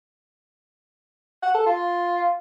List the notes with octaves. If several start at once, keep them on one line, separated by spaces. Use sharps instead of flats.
F#5
A4
F4